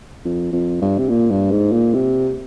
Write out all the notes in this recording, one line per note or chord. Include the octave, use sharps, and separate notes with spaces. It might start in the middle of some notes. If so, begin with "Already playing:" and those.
F2
F2
G2
C3
A#2
G2
G#2
A#2
C3